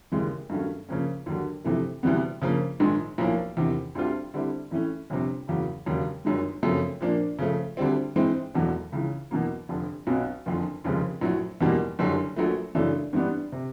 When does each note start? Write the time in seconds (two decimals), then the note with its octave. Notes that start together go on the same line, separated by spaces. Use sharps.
0.12 D#2 C#3 E3 G#3
0.50 G2 D#3 F#3 A3 C#4
0.89 C#3 F3 A#3 C#4
1.26 D#2 D3 F#3
1.65 F2 C3 E3 A3
2.03 D2 C3 E3 G3 B3
2.42 C#3 F3 A#3
2.80 A#1 G#2 D#3 G#3
3.18 B1 A2 F3 A#3
3.57 E2 C3 D#3
3.95 D2 D3 G3 C4 F4
4.34 D3 G3 C4 E4
4.71 A2 E3 A3 C#4
5.10 G1 F2 C3
5.48 E2 C#3 F#3 A#3
5.86 E1 D#2 C#3 F#3 A#3
6.25 G1 F#2 D#3 G#3
6.63 F#2 C#3 F3 A3 C4
7.00 A#2 F3 A#3 D4
7.39 C#3 F3 A3
7.77 D2 D3 G3 C4
8.16 G#2 E3 G#3 C4 E4
8.55 E1 E2 B2 F#3 A3
8.92 C#2 C#3 E3
9.31 E2 B2 F#3 A#3
9.69 F1 F2 D3
10.07 B1 B2 F#3 B3 D#4
10.46 F#1 F2 D3
10.84 F1 D#2 C#3 F3 G#3
11.21 A#1 A2 F#3
11.60 F#1 E2 B2 G3 A#3
11.99 F#1 F#2 D3 G3
12.36 A#1 A#2 F#3 A3
12.75 F#2 C#3 E3 A3 D4
13.13 G#2 E3 G3 B3 D4
13.52 C3